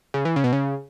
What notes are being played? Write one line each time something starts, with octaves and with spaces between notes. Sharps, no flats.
C#3
E3
C#3
B2
C#3